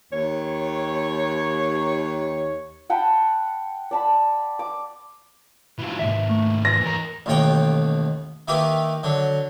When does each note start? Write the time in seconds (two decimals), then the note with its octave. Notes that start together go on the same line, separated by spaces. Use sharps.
0.12 D#2 C#5
2.90 F#5 G5 A5 B5
3.91 D5 A5 B5
4.59 D6
5.78 E3 F#3
5.99 D#2 G#2 E5
6.29 A3
6.65 E3 A#6
6.83 D#2 A#4
7.26 A1 D#2 B2 C#5 G5
8.48 D#3 A#3 E4 G4 B4
9.03 D3 F#3